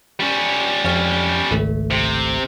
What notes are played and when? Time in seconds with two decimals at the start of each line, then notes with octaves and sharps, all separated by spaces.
0.20 G3 C#4
0.84 F2 C#5 F6
1.51 G#1 C#2 A3
1.91 C3